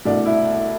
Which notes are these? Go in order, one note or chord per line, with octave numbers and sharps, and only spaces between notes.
C2 B2 A3 D4
E4